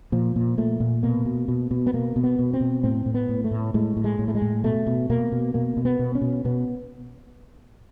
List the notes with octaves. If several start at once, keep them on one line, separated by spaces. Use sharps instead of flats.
A#2 F3
A#2
A#2 A3
A#2
B2 A#3
B2
B2
B2
B3
B2 A#3
B2
B3
B2
C4
B2
A2 C4
A2
B3
A2
A3
A2
A2 G#3
A2
G#3
A2
A3
G#3
A2
B2 A3
B2
B2 A#3
B2
B2 A#3
B2
B3
B2
C#4
B2
B2 B3